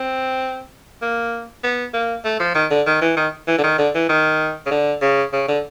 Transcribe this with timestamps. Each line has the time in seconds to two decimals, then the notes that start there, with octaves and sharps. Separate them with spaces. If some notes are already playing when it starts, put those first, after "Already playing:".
Already playing: C4
1.02 A#3
1.64 B3
1.94 A#3
2.24 A3
2.40 F3
2.55 D#3
2.71 D3
2.87 D#3
3.02 E3
3.17 D#3
3.48 E3
3.58 D3
3.63 D#3
3.78 D3
3.95 E3
4.09 D#3
4.66 C#3
4.71 D3
5.02 C#3
5.33 C#3
5.48 D3